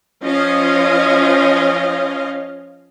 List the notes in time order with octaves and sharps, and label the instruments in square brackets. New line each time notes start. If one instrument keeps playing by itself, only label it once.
[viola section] F3 C#4 D#5 F5